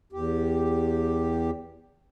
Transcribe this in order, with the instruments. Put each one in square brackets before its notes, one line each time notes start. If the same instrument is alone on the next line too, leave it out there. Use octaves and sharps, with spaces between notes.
[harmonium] E2 G4